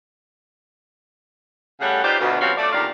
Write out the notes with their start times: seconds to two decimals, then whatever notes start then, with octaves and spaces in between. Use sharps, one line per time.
1.81 C#3 G3 A3 C#4 F#5
2.03 D#4 F4 G4 B4 C5 D5
2.20 D2 B2
2.40 F3 G3 C4 C#4 F4 F#4
2.57 A3 D5
2.73 E2 A#2 D#3 D4 G4 F5